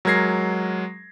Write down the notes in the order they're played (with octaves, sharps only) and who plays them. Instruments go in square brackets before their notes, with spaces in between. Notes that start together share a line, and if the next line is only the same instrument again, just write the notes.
[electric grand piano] F#3 G#3 A#4 G#6 A#6 C7